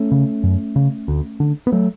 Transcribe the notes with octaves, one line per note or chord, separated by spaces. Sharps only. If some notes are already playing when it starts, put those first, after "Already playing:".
Already playing: A3 C#4
C#3
F#2
C#3
D2
D3
B3
F#3 A3